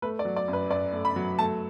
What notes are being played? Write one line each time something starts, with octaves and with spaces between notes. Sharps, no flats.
A3 B4
D5
F#3
D5
F#2
B4
F#2 D5
A3
B5
F#3
A3 A5